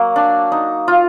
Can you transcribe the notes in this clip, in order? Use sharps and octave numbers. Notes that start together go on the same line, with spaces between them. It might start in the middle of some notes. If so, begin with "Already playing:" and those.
Already playing: F#3 A#3
D4
D#4
F4